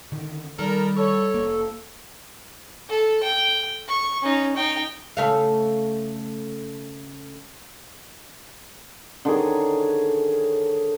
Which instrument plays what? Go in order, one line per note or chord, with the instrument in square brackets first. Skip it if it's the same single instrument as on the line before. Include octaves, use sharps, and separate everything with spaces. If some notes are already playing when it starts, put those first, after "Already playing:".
[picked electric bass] D3 D#3
[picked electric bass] D#3 [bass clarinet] G3 [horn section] A4 A#4
[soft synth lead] A4 [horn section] C#5
[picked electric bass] F1 A#3
[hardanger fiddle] A4
G5
C#6
C#4 D#4
D#4 G5
[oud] C#3 A3 F5
[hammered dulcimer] D3 D#3 G#4 C#5